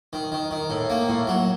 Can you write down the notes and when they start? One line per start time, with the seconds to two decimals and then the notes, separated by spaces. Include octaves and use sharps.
0.13 D#3
0.32 D#3
0.51 D#3
0.70 A2
0.90 A#3
1.08 A2
1.27 F#3